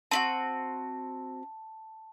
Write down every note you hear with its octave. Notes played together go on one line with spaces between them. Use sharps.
C4 E4 F#4 A5